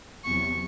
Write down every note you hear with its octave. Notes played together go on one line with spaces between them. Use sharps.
E2 C3 F#3 C#6